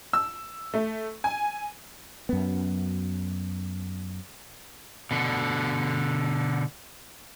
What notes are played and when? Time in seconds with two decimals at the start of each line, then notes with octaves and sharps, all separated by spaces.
0.13 E6
0.74 A3
1.24 G#5
2.29 F#2 B3
5.11 B2 D3